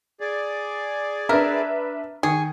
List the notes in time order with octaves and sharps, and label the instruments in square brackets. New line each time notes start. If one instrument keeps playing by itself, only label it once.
[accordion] G#4 D5
[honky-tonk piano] D4 B4 E5 [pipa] A#4
[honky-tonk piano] D#3 [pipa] G#4 [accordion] C#6